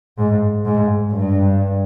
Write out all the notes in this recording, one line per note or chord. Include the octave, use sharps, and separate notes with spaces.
G#2
G#2
G2